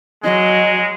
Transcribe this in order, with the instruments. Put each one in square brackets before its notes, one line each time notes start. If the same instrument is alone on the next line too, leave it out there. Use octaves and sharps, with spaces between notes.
[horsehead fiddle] F#3 [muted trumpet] G#3 [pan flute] D#5